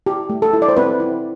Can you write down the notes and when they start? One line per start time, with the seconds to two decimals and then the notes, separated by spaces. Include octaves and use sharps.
0.06 E4 G4
0.30 A3
0.42 A4
0.53 E4
0.62 D5
0.69 C5
0.77 C4 B4
1.00 E4